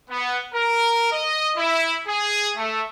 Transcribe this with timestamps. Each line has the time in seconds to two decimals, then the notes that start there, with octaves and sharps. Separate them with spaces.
0.10 B3
0.54 A#4
1.12 D#5
1.57 E4
2.08 G#4
2.56 A3